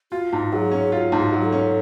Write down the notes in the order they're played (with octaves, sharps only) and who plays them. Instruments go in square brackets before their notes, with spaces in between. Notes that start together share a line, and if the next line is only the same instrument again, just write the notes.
[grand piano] F4 [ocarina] F#4
[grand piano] G#2
[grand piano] F#3 [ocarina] G#4
[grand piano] C#4
[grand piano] F4 [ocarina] G#4
[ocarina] F#4
[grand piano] G#2
[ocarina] G#4
F#4
[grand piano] F#3
[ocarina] A4
[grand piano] C#4